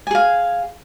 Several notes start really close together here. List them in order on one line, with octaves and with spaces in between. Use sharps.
G#5 G#4 F5